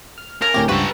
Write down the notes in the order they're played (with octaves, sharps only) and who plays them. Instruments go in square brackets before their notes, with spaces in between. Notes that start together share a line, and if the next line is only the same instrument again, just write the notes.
[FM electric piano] F6
[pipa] C#3 [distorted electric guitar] A#4 [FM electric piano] G#5 A5
[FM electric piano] D2 A2 C3 [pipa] A#3 C#4 G4
[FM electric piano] C#2 G2 [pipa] C4 F4 F#4 [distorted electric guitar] A4 B4